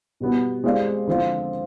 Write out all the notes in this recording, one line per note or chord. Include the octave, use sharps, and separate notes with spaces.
B2 G3 B3
G#3 C4 G4 D5 F5
D3 F3 C4 F4